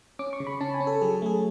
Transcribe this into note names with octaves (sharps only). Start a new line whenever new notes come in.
C#4 D6
C#6
C#3
B5
C#4 A5
G#5
C#4
A4
F#3 G#4
A3 G#4